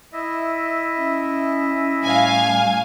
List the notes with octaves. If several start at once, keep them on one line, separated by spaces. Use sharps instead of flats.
E4 D#5 E5
C#4
A2 G3 F5 G#5